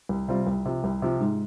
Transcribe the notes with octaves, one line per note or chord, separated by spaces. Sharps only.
C2
C3 G3 C4 F4
C2
C3 F3
C2
C3 F3
G#2